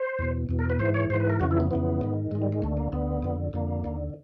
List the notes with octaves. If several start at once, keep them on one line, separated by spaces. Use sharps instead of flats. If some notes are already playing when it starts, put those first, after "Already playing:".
Already playing: C5
E2 B2
E2 B2
A#4
B4
G#2 E3 C5
C#5
G#2 E3 C5
B4
A#4
F2 C#3 E3 F#4
E4
B3
F2 C#3 E3 B3
G#2 D#3
G#2 D#3 G#3
G3
G#3
D2 D3 A3
A#3
D2 D3 B3
F2 D3
F2 D3 A#3
D#2 D3